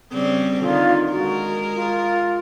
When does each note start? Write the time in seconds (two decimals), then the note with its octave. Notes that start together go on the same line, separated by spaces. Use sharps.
0.13 C#3 G3 C4
0.61 D3 D#3 F4
1.11 G#3 F#4 A#4
1.74 F4